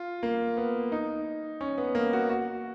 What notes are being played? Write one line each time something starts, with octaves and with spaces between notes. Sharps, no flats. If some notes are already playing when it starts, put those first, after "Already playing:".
Already playing: F4
A#3
B3
D#4
C#4
B3
A#3
F#4
F#4